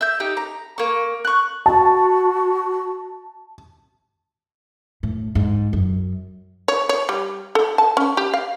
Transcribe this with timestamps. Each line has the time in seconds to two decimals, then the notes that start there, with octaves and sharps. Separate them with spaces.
0.01 E5 G6
0.20 D#4 G4
0.37 A#5
0.78 A#3 C#6
1.25 C#6 F#6
1.66 F#4 A5
5.03 A2
5.35 G#2
5.73 F#2
6.68 C#5
6.89 C#5
7.09 G3
7.55 A4
7.78 A5
7.97 C#4
8.17 G4
8.34 F5